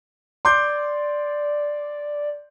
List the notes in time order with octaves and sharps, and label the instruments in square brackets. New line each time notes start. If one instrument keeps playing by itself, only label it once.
[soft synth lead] D5 [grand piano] C6 D6 G6